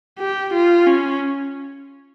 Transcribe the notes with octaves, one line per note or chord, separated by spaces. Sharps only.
G4
F4
C#4